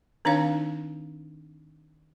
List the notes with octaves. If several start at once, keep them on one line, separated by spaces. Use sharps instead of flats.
D#3 C4 D4 D#4 C#5 F5